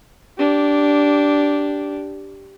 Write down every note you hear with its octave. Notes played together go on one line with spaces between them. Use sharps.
D4 G4